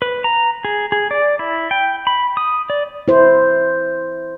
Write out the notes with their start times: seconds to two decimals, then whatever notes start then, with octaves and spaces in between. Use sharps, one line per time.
0.02 B4
0.24 A#5
0.65 G#4
0.92 G#4
1.11 D5
1.39 E4
1.71 G5
2.07 B5
2.37 D#6
2.70 D5
3.08 E4 C5